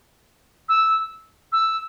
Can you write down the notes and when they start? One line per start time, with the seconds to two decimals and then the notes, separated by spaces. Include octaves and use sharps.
0.69 E6
1.52 E6